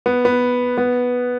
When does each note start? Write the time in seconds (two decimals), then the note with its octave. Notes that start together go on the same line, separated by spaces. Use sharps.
0.06 B3
0.25 B3
0.78 B3